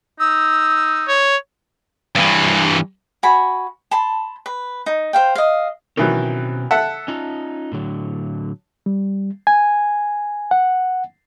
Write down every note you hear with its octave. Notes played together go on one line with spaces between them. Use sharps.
D#4 E6
C#5
G2 E3
F#4 G#5 B5
A5 B5 C6
B4
D#4
C5 F5 G5
D#5 F5
B2 D#3 E3 F#3 C4 C#4
A4 E5 F#5
C#4 D#4 F4
A2 D3 F#3
G3
G#5
F#5